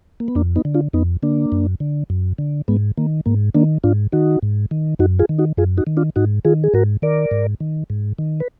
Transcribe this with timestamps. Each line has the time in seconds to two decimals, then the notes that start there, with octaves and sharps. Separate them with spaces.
0.20 A#3
0.28 B3
0.35 F2 A#3 D4
0.56 B3 D#4
0.65 D3
0.74 D4 F4
0.93 F2 B3 D#4
1.23 D3 A#3 D4
1.52 F#2
1.80 D3
2.10 F#2
2.38 D3
2.68 G#2 G#3 B3
2.98 D#3 A#3
3.26 G#2 A#3
3.54 D#3 A#3 D4
3.84 G#2 D4 F4
4.12 D#3 D#4 F#4
4.43 G#2
4.71 D#3
4.99 F#2 D#4 F#4
5.19 F4 G#4
5.29 D#3
5.38 D#4 F#4
5.57 F#2 F4 G#4
5.77 D#4 F#4
5.87 D#3
5.97 D4 F4
6.16 G#2 D#4 F#4
6.45 D#3 F4 G#4
6.64 G#4
6.74 G#2 F#4 A#4
7.02 D#3 A#4 D5
7.31 G#2
7.60 D#3
7.90 G#2
8.19 D#3
8.40 B4